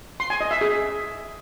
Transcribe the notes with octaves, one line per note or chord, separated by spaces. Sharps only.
C6
G#5
D#5
E5
G#4